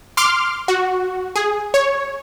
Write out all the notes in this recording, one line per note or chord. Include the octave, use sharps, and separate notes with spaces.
C6 D6 F6
F#4
G#4
C#5